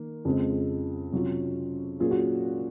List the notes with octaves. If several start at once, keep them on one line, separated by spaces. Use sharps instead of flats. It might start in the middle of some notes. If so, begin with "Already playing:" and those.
Already playing: D#3 A#3
F2 C#3 F3 G#3 C4
C3 F#3 C#4 F4
A#2 F#3 C#4 F4 G#4
F#4